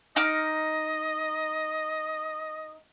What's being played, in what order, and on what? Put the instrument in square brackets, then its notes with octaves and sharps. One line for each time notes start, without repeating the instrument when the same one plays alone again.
[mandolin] D#4 D6 F6 [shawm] D#5